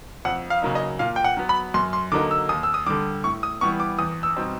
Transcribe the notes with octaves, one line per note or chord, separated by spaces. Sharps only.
F2 F#5
F5
C#3 F#3 A#3 D#4
D#5
A#2 F5
G5
F#5
F#3 B3
B5
F#2 C6
C6
D3 F#3 A#3 D#4 D6
E6
D#2 D#6
E6
D#6
D3 G3 D6
A2 C#6
D#6
E3 G3 B3 C#6
D6
E2 D#6
E6
B2 G3 C4 D#4